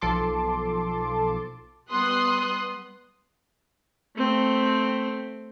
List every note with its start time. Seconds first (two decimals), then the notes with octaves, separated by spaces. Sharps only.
0.01 B1 F3 A4 A5 C6 D6
1.90 G3 B3 C6 D#6 F#6
4.16 A3 C4